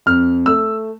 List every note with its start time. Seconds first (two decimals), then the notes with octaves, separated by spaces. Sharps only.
0.06 F2 F6
0.46 A3 E6